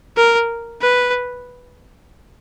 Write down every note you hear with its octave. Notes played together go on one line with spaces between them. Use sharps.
A#4
B4